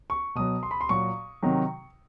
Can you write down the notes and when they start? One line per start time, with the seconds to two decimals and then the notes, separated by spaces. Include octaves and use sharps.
0.10 C#6
0.35 B2 F#3 D#6
0.63 C6
0.71 B5
0.81 C6
0.89 A#2 F#3 C#6
1.43 C3 D#3 F#3